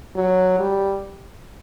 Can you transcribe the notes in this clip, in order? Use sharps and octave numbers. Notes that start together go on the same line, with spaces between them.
F#3
G3